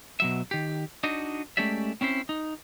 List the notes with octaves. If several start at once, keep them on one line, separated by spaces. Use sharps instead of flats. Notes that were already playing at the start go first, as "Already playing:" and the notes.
B2 F#3 E5
D#3 G4
D4 D#4 F#4 D#5
G#3 A3 C#4 G4 D5 E5
C4 C#4 E4 C5
D#4